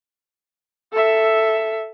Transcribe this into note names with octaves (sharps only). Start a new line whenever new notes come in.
A4 E5